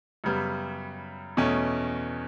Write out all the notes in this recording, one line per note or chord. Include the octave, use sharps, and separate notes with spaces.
F#2 C#3 G3 B3
E2 B2 A3 C#4